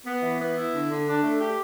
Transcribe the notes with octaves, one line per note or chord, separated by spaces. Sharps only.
B3
E3
B3
E4
D3
D3
D4
A3
G4